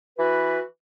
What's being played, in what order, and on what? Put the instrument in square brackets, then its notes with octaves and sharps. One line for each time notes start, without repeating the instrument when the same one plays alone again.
[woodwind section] E3 F#4 B4